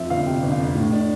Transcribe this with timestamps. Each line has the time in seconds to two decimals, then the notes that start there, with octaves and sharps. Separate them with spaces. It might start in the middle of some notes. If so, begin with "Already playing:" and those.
Already playing: F2 F3 E5
0.10 G1 F5
0.26 C3 G5
0.42 G1
0.52 F5
0.59 F2
0.75 A2
0.92 D4